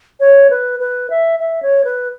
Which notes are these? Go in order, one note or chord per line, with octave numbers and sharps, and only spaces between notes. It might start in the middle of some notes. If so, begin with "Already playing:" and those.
C#5
B4
B4
E5
E5
C#5
B4